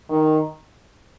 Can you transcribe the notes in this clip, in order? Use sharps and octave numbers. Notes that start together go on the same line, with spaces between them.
D#3